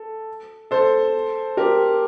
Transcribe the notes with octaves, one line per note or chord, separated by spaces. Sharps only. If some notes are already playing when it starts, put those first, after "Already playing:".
Already playing: A4
A4 C5
G4 A#4